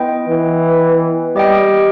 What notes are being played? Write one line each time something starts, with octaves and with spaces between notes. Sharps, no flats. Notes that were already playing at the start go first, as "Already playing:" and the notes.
Already playing: B3 E4 B4 D#5 G5
E3
G3 G4 D#5 G5